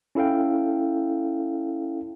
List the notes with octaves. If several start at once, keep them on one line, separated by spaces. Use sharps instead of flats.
C#4 E4 A4 F5 G5